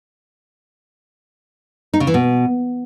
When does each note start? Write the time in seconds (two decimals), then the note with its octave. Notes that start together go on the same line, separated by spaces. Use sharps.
1.93 D#4
2.00 C#3
2.07 E3
2.14 B2